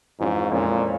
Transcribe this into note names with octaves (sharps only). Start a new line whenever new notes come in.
F2 G#2 E3 G#3 C#4 F4
F2 A#2 E3 G#3 C#4 F4